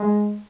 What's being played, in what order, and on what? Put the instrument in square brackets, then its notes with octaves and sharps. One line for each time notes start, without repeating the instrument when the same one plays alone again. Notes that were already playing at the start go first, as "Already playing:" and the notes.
Already playing: [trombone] G#3